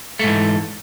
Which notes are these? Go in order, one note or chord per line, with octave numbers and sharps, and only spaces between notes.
G#2 E3 A3